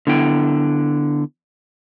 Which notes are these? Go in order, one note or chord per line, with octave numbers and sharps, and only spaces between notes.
D3 B3 E4 G5